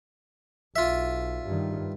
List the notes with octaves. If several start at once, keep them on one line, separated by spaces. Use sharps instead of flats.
B1 F4 E5
G2 D#3